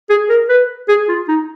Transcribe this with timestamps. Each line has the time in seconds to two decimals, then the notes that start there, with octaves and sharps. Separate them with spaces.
0.10 G#4
0.30 A#4
0.49 B4
0.89 G#4
1.09 F4
1.28 D#4